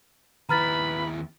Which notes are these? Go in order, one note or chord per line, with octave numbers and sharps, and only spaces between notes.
D#2 E4 B4 A#5 B5 F6 A6